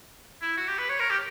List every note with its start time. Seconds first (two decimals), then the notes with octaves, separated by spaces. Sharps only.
0.42 E4
0.57 F#4
0.68 G4
0.79 B4
0.89 C#5
1.00 A#4
1.10 G4